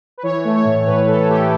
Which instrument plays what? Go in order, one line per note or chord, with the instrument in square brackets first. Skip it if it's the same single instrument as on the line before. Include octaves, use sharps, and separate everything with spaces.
[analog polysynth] B4
E3 C#5
A3
C#5
A2
A2 B4
E3 A4
A3 G4